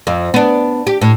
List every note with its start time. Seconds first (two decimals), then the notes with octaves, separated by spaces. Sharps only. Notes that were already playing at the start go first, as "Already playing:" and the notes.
0.07 F2
0.34 B3 D4
0.87 G4
1.01 A2